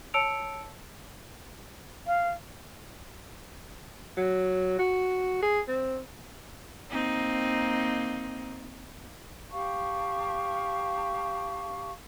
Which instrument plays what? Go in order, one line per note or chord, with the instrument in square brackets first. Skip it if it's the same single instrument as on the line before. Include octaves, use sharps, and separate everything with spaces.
[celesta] C#5 A5 E6 C#7 D7 F7
[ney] F5
[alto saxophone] F#3
F#4
G#4
C4
[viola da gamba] A#3 C4 D#4
[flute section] G4 F5 A5 C#6